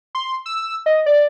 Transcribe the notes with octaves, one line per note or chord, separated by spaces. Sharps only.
C6
E6
D#5
D5